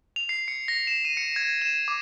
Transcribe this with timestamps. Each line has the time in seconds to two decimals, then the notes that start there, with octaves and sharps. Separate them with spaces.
0.16 F7
0.29 C7
0.48 C#7
0.68 A#6
0.87 E7
1.05 D#7
1.17 C#7
1.36 G#6
1.62 E7
1.88 D6